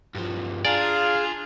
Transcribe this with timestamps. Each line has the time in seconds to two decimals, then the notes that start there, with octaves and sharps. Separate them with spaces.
0.15 G2 F3
0.65 D4 F4 G#4 D5 F5 A#5